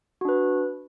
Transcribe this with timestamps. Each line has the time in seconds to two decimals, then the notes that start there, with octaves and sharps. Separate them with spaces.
0.21 F#4
0.25 D4
0.29 B4